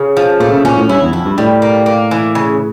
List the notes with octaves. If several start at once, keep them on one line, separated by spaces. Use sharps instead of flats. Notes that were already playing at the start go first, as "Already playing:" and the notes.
Already playing: C#3
F3
A#2 A3
C#3
A#2 C#4
A2
G2 E4
E2
F2 E4
G2
A2 G3
A#3
A#3
E3
C#3